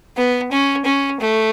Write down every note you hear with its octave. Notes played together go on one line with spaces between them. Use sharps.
B3
C#4
C#4
A3